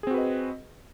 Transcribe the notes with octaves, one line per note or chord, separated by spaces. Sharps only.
C4 F#4 G#4 B4 D#5